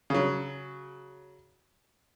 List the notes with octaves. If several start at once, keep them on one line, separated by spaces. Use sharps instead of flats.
C#3 F#3